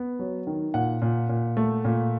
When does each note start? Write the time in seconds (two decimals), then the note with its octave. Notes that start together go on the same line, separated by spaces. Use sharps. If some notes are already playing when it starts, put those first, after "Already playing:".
Already playing: B3
0.19 F#3
0.47 D#3
0.74 A#2 F#5
1.02 A#2
1.29 A#2
1.57 A3
1.85 A#2